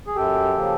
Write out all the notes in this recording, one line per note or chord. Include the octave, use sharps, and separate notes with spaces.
G#4
F#2 G4 A4
C#3 F3 A#3